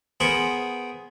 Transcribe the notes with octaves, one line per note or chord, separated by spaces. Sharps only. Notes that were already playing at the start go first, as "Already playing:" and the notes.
B3 G#4 A#4 C5 F#5